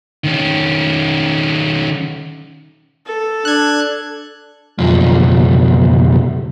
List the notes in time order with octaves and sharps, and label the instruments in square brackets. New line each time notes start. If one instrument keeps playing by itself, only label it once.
[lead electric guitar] D#3 C#4
[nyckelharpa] A4
[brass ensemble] D4 [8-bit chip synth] F#6 G#6
[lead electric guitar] B1 F2